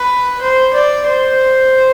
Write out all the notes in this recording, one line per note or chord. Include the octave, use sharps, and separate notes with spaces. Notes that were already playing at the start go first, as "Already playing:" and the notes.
Already playing: B4
C5
D5
C5